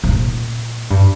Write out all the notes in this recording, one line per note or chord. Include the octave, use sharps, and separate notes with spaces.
G#2
A#2
G2